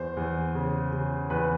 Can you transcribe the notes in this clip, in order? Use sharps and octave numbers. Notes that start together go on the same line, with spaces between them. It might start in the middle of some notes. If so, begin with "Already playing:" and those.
Already playing: E2 C5
E2
C#3
C#3
E2 B4